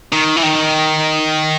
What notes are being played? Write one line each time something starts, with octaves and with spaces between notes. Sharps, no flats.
D#3
E3
D#3